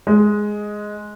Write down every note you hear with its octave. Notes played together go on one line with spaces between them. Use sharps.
G#3